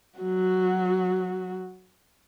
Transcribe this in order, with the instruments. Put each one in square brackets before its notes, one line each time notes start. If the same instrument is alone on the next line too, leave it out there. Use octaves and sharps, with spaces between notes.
[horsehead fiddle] F#3 F#4